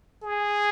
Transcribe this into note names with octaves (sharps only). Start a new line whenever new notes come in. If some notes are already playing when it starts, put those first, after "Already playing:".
G#4